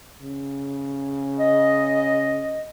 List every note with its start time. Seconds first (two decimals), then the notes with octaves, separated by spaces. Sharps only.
0.22 C#3
1.39 D#5